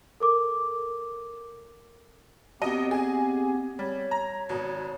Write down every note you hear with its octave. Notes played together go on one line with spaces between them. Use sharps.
A4 A#4 D6
F#2 B3 C4 G4 D#5 D#7
G#4 G#5
G3 C#5
A#5
G#1 B2